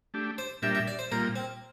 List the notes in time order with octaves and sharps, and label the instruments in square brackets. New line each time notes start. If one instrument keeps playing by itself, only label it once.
[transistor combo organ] A3 D4 G4
[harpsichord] C5
[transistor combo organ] A#2 G3 D4 G4 A#4 [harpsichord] E5
[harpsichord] E5
D5
C5
[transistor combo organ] A#2 G3 A#3 F4 [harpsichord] A#4
[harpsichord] C4